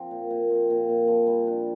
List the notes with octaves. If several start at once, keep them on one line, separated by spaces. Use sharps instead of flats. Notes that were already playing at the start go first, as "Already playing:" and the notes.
Already playing: F3 C4
A#2
A#2
C4
A#2
A#2
F3
G3
D4